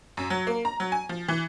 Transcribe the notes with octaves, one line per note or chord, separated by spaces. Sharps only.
F#2
F#3
A#3
A#5
F#3
G#5
F3
E3